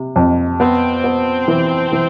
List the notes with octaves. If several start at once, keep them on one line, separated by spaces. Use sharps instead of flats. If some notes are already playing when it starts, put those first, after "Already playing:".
Already playing: C3
F2
B3 C4
B3
E3
E3